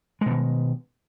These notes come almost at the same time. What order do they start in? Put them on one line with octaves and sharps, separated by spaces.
G#3 B2 D#3